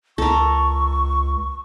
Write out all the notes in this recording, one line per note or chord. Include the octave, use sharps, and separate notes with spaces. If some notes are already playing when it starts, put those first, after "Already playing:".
C#2 A4 A#4 C#6